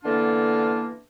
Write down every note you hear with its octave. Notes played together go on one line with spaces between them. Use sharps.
D3 E3 A#3 B3 D4 F4